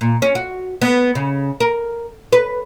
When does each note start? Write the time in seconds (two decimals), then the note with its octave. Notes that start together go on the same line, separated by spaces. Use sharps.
0.01 A#2
0.22 C#4
0.35 F#4
0.81 B3
1.15 C#3
1.60 A#4
2.33 B4